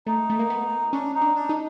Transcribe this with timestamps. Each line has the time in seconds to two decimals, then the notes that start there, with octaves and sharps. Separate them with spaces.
0.07 A3 D#4
0.30 A3
0.39 A#3
0.50 B3
0.92 C#4 D4
1.14 D#4
1.21 D4
1.35 D4
1.49 D#4